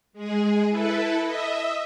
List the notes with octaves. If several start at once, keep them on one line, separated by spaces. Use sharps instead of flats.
G#3 G#4
E4 A4 B4
D#5 E5